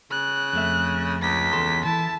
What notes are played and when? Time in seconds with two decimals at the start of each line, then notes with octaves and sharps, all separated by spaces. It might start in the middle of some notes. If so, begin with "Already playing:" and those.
0.11 C#3 F#6
0.53 F2 A3 E5
1.22 C#2 B6
1.53 E2 A4 C6
1.85 E3 E4 A5